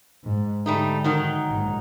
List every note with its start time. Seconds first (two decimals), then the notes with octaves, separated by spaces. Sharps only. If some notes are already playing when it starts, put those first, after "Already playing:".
0.25 G#2
0.66 G#2 D3 G3 A3 D#4
1.04 D#3 F#3 D#4
1.49 A#1 G#2